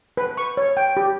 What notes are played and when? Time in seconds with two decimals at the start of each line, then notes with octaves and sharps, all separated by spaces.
0.17 B4
0.37 C#6
0.57 C#5
0.77 G5
0.97 G4